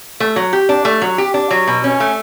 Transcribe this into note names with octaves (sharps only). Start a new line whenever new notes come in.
A3
F#3
G4
D4
A3
F#3
G4
D4
F#3
B2
C#4
A3